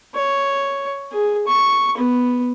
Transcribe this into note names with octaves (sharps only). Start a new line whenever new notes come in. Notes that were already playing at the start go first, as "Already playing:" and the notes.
C#5
G#4
C#6
B3